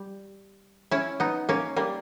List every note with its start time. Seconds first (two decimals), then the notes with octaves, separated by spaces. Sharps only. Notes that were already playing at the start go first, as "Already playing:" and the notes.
Already playing: G3
0.91 C#4 E4
1.20 B3 D#4
1.49 A#3 C#4
1.76 G3 A#3